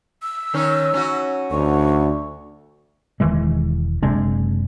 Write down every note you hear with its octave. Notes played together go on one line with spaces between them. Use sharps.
E6
D#3 C#4
C#4 F#4
D2 C#6
E1 D#3 E3 G#3
F#1 C3 G#3 D4